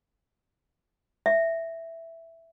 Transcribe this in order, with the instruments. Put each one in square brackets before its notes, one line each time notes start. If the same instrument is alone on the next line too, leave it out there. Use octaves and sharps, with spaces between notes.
[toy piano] E5